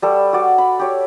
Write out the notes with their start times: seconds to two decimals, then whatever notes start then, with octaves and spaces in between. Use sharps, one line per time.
0.02 G3 A4 C#6
0.33 F#4 D5
0.58 B5
0.79 G4 C#5